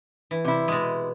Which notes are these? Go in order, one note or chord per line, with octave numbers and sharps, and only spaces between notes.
E3
C3 E4
B2 G#3